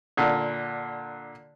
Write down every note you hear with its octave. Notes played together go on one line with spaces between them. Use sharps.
A#2 D3